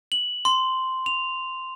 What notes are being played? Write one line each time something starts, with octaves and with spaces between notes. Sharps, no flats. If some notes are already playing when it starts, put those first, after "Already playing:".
F#7
C6
F7